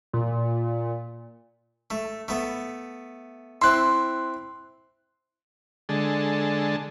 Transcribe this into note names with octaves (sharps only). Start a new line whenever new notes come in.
A#2
A3
A3 B3
C4 E4 C6 F#6
D3 G#3 A4